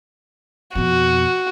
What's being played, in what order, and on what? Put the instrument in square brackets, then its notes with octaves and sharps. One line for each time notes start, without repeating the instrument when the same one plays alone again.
[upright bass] F2 B2 [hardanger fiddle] F#4